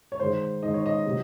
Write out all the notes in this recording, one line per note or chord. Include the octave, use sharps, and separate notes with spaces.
C#5
G#2 D#3 G#3 C5
G#2 D#3 G#3 D#5
C#5
D#5
C3 F#3